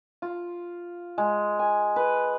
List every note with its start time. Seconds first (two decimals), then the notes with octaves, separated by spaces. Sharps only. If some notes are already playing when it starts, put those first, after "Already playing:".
0.22 F4
1.18 G#3
1.59 G#5
1.96 B4